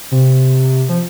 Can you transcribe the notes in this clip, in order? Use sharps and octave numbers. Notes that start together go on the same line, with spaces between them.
C3
F3